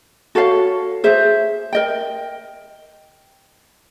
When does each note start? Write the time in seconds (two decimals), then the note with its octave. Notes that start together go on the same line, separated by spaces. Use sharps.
0.35 F#4 A4 C#5 F5
1.04 G#4 C5 E5
1.73 A#4 D#5 G5